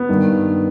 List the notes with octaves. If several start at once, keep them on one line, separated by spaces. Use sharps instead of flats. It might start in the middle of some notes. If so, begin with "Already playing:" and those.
Already playing: B3
G2 D#3